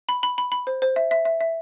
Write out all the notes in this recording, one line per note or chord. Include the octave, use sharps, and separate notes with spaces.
B5
B5
B5
B5
C5
C5
E5
E5
E5
E5